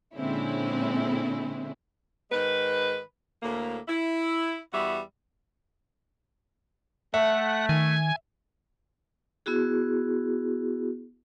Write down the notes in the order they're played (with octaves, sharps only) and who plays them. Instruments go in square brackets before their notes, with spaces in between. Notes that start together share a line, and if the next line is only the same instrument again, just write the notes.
[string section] A#2 D3 G#3 C4 C#4 E4
[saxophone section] G#2 D#3 G#3 B4
D2 A2 A#3
E4
E2 G3 F#4 E5
[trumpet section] A3 [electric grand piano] E5 [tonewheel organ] F#5
[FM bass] D#3 [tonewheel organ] G#5
[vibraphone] B3 E4 F#4 G#4